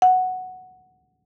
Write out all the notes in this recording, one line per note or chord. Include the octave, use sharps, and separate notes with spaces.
F#5